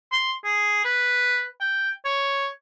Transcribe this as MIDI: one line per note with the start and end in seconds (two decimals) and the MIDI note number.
0.12 0.32 84
0.44 0.82 68
0.85 1.45 71
1.61 1.90 79
2.05 2.48 73